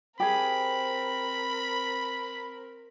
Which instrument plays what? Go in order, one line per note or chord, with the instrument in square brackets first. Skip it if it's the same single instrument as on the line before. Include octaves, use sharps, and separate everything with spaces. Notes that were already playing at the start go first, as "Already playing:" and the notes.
[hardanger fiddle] C4 A#4 [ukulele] G4 G#4 [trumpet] B5